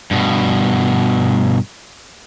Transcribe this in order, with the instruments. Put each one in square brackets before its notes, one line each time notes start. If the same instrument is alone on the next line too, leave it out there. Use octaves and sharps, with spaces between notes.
[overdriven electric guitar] G2 B2